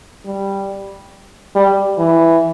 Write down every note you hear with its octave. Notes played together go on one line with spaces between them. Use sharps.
G3
G3
E3